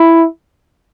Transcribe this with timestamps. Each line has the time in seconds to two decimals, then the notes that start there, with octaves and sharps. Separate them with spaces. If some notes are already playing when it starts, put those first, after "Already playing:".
Already playing: E4